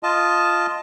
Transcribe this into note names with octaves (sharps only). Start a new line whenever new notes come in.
F4 D#5 A5